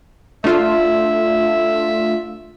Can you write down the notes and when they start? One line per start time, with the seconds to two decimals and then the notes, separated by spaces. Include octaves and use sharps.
0.44 A3 D4 F4 E5